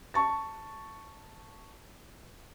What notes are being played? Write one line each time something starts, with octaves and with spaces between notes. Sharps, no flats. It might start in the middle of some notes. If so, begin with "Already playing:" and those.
A5 C#6 A6